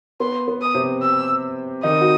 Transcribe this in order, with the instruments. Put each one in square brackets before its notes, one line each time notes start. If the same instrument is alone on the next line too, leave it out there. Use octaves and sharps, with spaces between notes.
[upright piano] B3 [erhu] C6
[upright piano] B3
[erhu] D#6
[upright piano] C3 C4
[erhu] E6
[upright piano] D#3 D#4 [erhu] D#6
[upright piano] F#4